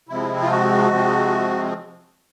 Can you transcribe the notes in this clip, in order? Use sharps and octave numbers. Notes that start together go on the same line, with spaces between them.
C3 F3 G#3 C4 E4
F4
F#4
C3 F3 G#3 C4